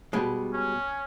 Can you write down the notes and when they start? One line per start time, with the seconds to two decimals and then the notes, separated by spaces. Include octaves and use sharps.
0.13 B2 G3 G#3
0.53 C#4